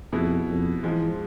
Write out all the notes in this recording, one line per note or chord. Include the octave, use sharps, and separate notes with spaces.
F2 B2 B3 E4 G#4
F2
G#2 E3 F3 G#3